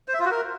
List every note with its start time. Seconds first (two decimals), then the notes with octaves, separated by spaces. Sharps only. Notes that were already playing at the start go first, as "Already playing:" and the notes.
0.08 C5
0.14 E5
0.20 F4
0.25 F#4
0.31 A#4